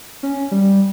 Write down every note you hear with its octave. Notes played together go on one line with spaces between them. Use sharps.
C#4
G3